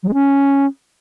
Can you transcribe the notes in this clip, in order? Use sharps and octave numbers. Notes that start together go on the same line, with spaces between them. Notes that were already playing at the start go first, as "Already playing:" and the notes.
F#3
G#3
C#4